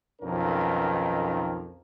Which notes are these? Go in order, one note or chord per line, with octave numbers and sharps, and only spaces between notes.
B1 F2 D#3 C#4 A#4